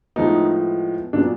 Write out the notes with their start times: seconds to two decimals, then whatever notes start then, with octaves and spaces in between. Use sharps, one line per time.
0.16 A2 F3 G#3 B3 D#4
1.13 A#2 F#3 B3 D4